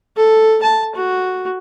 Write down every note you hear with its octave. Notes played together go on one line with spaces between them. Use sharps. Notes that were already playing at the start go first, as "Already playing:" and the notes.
A4
A5
F#4